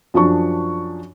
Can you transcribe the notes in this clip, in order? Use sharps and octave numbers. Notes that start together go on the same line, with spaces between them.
F#2 F3 D4 C#6